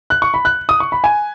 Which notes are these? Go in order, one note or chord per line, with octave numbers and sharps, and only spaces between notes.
F#6
C#6
B5
F#6
D#6
C#6
B5
G#5